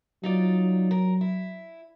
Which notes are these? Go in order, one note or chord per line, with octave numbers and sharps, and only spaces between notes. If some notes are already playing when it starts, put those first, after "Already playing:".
F#3 D#4 F4 D5
A#4
E4